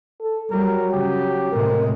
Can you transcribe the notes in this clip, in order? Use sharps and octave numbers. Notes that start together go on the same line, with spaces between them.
A4
F#3 G3 A#4
C#3 G4
A2 C3 G#3 A#4